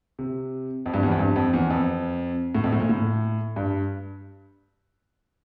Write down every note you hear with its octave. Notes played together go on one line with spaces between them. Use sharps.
C3
F2
G2
E2
F2
G2
F2
E2
F2
A2
F2
A2
A#2
A2
G2